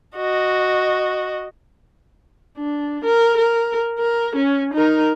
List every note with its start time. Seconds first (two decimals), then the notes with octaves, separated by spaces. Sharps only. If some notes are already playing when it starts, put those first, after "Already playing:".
0.16 F#4 D#5
2.58 D4
3.05 A#4
3.37 A#4
3.99 A#4
4.36 C#4
4.73 D#4 A#4